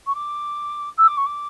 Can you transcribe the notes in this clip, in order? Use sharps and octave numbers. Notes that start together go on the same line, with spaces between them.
C#6
D6
E6
D6
C#6
D6